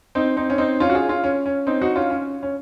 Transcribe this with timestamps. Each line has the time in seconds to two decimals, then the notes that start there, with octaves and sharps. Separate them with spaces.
0.15 C4 D#4
0.37 C4 D#4
0.50 C#4
0.58 C4 D#4
0.80 C#4 F4
0.90 F#4
0.95 F4 G#4
1.09 C#4 F4
1.24 C#4
1.46 C#4
1.67 C4 D#4
1.82 D#4 F#4
1.96 C#4 F4
2.10 C#4
2.43 C#4